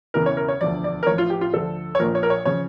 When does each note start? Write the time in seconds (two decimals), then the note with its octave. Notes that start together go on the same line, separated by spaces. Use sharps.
0.14 E1 E2 C#3 E3 A#4
0.26 C#5
0.37 A#4
0.48 C#5
0.61 E1 D2 D3 F3 D5
0.84 D5
1.03 A#4
1.07 A1 A2 F3 C#5
1.18 F4
1.30 G4
1.41 F4
1.52 D2 D3 F3 A4
1.95 C#5
1.99 A#1 A#2 F3 A#4
2.15 C#5
2.23 A#4
2.30 C#5
2.45 C#3 F3 C#5